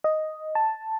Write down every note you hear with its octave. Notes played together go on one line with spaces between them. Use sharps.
D#5
A5